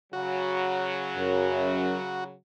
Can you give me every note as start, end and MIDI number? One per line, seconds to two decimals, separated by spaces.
0.13 2.32 49
0.13 2.32 54
0.13 2.24 66
1.18 1.97 42